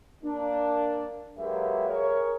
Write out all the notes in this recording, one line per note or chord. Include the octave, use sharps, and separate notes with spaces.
A#3 D4
F#3 G#3 A#3 G4 B4 E5
G#4 A#4 C#5